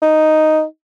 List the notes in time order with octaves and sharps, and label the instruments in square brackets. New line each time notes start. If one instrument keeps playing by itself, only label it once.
[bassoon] D#4